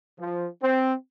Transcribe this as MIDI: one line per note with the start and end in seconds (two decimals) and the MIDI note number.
0.18 0.46 53
0.63 0.93 60